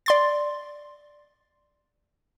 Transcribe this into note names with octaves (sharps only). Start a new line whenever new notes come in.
D5 C6 A6